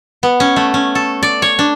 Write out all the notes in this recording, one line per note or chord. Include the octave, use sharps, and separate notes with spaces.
B3
C#4
A3
C#4
A4
D5
C#5
D4